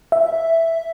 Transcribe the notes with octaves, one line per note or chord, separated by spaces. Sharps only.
E5